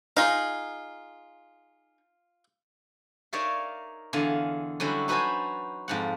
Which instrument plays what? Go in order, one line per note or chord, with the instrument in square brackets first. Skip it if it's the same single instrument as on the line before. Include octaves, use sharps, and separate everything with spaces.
[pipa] D#4 G#4 [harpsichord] F4 F5
[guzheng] D#4 A#4 C#5 D5 E5 F5
E2 D3 F5 G#5
D3 F#3 G3 C#4 E4
D#4 F#4 B4 C5 G#5 A5
F2 G#2 F#5